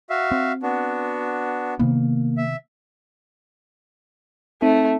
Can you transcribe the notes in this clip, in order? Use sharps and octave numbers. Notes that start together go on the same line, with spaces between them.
F#4 E5 F5
C4
B3 D4 F#4
C3 D#3 A#3 B3
E5
A3 C4 D#4